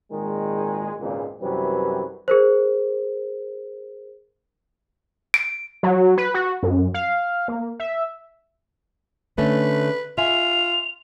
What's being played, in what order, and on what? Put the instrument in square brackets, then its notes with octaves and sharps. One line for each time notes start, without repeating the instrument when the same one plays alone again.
[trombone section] G#1 A#2 D#3 G#3
G#1 C#2 A#2
F#2 C3 E3 F#3 G3 B4
[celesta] G#4 A#4 C5
[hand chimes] D7
[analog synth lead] F#3
B4
F#4
F#2
F5
A#3
E5
[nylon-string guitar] D3 A3 C#4 [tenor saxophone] B4
[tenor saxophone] F4 [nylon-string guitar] E5 G#5 [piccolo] F7